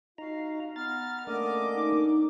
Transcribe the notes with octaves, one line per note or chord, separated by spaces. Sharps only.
D#4 F4 F#4 F5 A#5
B3 A#5 F6 A6
A3 A#3 C#4 D4 A#4 D#5 F#5 D6
D#4